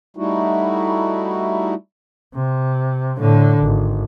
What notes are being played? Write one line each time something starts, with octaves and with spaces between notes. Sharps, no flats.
G3 A3 D#4 E4 F#4
C3
A2 D3
G#1